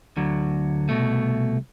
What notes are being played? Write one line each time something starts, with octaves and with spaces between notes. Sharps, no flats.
D2 D3 F#3
C2 B2 A3